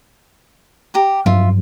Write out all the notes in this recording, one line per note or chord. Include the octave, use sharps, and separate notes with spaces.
G4 A#5 D6
G2 F3 F#3 F4 E5